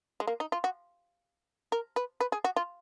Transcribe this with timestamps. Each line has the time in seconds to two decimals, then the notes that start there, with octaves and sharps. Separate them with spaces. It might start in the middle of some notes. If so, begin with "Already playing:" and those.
0.20 G#3
0.27 A#3
0.40 D#4
0.52 F4
0.64 F#4
1.72 A#4
1.96 B4
2.20 B4
2.32 G#4
2.44 F#4
2.56 F4